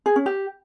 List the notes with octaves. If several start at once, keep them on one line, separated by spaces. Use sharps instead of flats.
G#4
C#4
G4